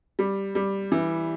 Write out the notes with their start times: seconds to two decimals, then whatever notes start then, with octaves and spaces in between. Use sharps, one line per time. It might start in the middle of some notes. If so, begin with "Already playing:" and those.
0.19 G3
0.55 G3
0.92 E3